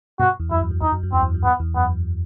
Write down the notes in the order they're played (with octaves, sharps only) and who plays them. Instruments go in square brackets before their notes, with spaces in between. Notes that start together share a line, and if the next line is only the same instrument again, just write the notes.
[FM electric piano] G2 B2 [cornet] F#4
[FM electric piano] E2
[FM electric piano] F#2 [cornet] E4
[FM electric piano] E2
F#2
[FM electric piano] E2 [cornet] D#4
[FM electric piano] F#2
F#2
[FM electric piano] E2 [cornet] C4
[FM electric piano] E2
F#2
[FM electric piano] E2 G2 [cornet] B3
[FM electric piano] E2
[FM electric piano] F#2 [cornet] B3